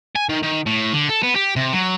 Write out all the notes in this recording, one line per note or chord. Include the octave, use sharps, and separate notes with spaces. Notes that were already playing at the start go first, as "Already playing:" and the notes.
G#5
D#3
D#3
A2
D3
A4
B3
G4
C3
F#3